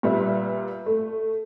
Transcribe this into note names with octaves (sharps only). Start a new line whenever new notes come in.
A#2 G3 B4 E5
A3